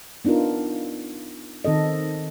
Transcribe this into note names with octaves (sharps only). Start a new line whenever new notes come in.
B3 D4 D#4 F4 A#4
D#3 C4 A4 D#5